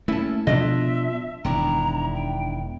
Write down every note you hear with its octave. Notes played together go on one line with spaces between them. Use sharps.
A3 A#3 C#4 E4 A5
B2 F3 D4 F4 D#5 E5
E1 D#3 D4 E4 A#5
G5